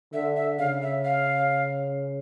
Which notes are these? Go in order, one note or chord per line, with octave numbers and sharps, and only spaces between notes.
D3 E5
E5
C#3 F5
E5
F5